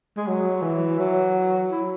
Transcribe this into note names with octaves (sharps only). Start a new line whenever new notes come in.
G#3
F#3
E3
F#3
E4